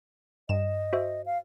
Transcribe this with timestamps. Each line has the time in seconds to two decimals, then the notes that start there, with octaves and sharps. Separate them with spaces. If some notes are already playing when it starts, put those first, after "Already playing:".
0.49 G2 D#5 E7
0.93 F#4 C5 E5
1.26 F5